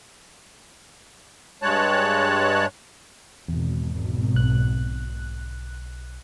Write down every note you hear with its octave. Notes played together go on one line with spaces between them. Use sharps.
G2 G#3 C#5 A5 F#6
G#1 E2 B2
B1 F#6